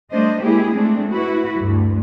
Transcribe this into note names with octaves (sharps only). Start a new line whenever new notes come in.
G3 A3 D4 C5 D#5
G#3 A#3 E4 G4 G#4
G#3 A3 C4 D4
E4 F#4 B4
D2 G2